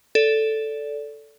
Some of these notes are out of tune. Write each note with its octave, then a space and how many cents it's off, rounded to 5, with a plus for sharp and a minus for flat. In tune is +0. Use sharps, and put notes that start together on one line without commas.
A4 +0 D5 -20